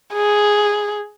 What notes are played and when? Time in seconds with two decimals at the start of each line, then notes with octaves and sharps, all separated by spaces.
0.14 G#4